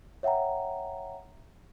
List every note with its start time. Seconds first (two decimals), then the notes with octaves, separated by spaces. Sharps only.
0.23 C#5 E5 F#5 G5 A#5